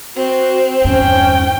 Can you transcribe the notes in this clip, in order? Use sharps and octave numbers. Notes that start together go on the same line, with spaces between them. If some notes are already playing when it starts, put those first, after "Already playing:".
C4 F#4
E2 G2 C#4 G5